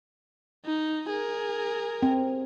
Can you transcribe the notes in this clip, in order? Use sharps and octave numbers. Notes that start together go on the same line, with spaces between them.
D#4
G#4 A#4
C4